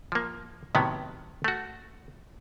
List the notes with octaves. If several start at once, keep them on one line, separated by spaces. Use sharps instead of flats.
F3 A#3
A2 C3 D#3 F#3 B3
A3 F#4